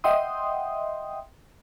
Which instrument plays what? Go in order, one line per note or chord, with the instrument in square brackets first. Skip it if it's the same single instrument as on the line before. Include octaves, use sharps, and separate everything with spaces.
[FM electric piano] D#5 E5 F#5 G5 C6 D#6